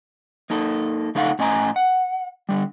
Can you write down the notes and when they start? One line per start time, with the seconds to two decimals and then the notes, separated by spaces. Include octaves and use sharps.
0.50 A#3 D#4 A4
1.15 C#3 A3 D#4 A4 F5 F#5
1.39 A2 C#4 D#5 G#5 A#5
1.76 F#5
2.49 D3 G3